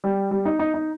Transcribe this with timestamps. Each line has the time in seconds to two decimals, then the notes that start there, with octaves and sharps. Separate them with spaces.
0.04 G3
0.31 G3
0.45 D#4
0.59 D#4
0.74 D#4